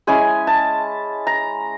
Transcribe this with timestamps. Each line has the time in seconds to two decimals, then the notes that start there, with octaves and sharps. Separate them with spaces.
0.07 G#3 C#4 E4 G#5
0.47 A5
1.27 A#5